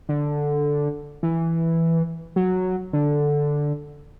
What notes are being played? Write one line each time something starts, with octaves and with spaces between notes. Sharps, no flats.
D3
E3
F#3
D3